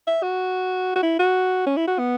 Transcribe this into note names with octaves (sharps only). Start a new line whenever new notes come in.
E5
F#4
F#4
E4
F#4
C#4
E4
F#4
B3